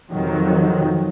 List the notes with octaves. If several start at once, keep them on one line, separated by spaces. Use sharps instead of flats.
F2 C3 D#3 F#3